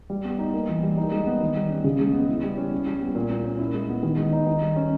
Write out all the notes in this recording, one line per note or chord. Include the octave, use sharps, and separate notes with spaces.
G3
B3
D#4
A#3
E3
G3
D#4
G#3
B3
D#3
G3
C#4
C#3
G#3
B3
E4
G3
C#4
E4
G3
B3
A#2
A#3
C#4
E4
G#3
B3
D#3
G#3
D#4
D#3
G3
C#4